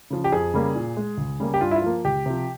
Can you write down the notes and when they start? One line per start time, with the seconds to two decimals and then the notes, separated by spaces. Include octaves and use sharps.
0.10 C#3 F3
0.24 G4
0.32 F2 G#4
0.54 C#3 G3 A#3
0.75 A#2
0.97 G#3
1.17 C#2
1.40 C#3 G3 A#3
1.54 G4
1.61 G2 F4
1.71 E4
1.76 F4
1.82 F3 A#3
2.05 C#2 G4
2.26 C3 F3